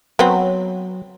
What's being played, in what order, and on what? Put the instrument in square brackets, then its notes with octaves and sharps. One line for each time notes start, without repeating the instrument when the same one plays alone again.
[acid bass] F#3 [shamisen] B3 C4